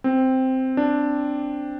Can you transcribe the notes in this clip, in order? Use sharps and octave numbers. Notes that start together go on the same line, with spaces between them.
C4
D4